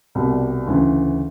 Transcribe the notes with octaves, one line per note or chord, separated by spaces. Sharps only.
C2 B2 G3
D2 C#3 E3